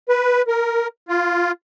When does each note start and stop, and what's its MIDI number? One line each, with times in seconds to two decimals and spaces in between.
0.09 0.42 71
0.48 0.87 70
1.09 1.52 65